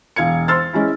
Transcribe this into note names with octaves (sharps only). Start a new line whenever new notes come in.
E1 F5 G#6 C#7
C5 C6 E6 F6 A6
G#3 C#4 E4